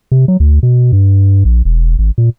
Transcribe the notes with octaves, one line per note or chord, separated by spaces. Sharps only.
C3
F#3
D2
B2
G2
A#1
E1
G#1
A#2